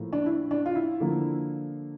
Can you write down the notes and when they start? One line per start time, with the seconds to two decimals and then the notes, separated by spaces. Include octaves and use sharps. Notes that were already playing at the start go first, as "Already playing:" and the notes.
Already playing: A2 F3 A#3
0.13 D4
0.26 E4
0.51 D4
0.66 F4
0.75 E4
1.00 D3 F3 A#3